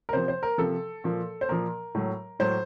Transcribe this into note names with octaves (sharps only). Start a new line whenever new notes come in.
A#4
C3 F3 C5
C5
A#4
C3 F3 A4
A#2 F3
C5
A#2 F3 A#4
A2 F#3
A2 F#3 C5